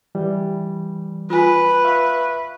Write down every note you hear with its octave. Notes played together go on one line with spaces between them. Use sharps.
E3 G3
F4 B4 G#5
E5 F5 C#6